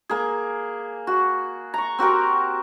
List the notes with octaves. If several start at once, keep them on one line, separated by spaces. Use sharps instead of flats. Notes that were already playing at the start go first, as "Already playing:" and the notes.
A#3 G#4
F#4
A#5 C#6
C4 F#4 G4 A#4